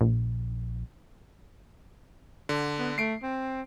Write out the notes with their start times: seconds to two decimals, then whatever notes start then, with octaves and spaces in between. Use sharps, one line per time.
0.01 A#1
2.49 D3
2.79 B3
2.98 A3 C7 D7
3.23 C4